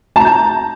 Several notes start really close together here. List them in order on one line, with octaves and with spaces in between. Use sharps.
A5 A#5 G6